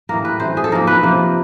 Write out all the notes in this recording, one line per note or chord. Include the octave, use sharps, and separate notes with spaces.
A2 E3 G3 A#3 A#4
B4
C3 E3 A3 C5
G#4
A4
G#2 F3 A#3 A#4
B4
C3 F3 A#3